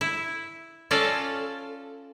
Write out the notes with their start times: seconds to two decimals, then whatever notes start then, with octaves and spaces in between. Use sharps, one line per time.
0.01 E4
0.91 C#4 F4 A4 D5 D#5